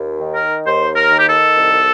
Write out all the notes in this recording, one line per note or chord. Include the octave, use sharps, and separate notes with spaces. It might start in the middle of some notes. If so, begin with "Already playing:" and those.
Already playing: D#2
D#3
A#4
D#2 C5
A#4
D#3
G4
A4
C2